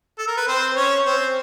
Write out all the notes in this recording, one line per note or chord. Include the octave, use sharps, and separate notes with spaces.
A4
A#4
B4
C4 C5
C#4 C#5
C4 C5